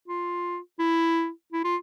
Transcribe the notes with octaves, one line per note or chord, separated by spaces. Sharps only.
F4
E4
E4
F4